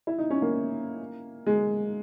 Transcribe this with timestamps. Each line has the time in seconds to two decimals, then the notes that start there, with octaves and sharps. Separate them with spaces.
0.07 E4
0.18 D#4
0.30 C#4
0.42 A#3
1.47 G#3